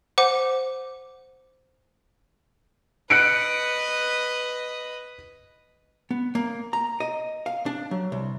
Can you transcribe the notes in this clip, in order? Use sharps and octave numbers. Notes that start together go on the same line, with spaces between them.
C5 F#5 D6
B4 D#5 F#6 C#7 D7
B3
A#3
A#5
D#5
F5
D4
F#3
C2